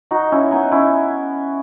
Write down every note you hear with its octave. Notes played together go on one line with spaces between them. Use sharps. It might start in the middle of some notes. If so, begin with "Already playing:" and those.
D#4 F#4
C#4 E4
B3 D#4
C#4 E4